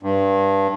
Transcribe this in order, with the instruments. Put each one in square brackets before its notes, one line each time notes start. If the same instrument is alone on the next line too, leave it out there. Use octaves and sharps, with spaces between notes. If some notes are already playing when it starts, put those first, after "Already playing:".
[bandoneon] G2